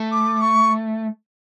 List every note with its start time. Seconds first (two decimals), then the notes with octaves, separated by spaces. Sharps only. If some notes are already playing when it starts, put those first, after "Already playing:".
Already playing: A3
0.11 D6
0.41 C#6